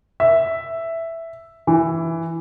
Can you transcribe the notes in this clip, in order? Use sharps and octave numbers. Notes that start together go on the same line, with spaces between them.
E5
E3